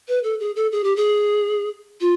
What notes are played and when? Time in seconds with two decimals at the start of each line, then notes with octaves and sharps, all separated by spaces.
0.08 B4
0.24 A4
0.40 G#4
0.56 A4
0.72 G#4
0.84 G4
0.96 G#4
2.01 F4